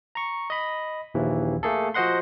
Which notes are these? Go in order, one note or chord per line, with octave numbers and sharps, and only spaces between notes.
A#5 C#6
D#5 B5
A#1 D#2 E3
A3 A#3 G#4 A4
F3 F#4 C5 D#5 F#5 C6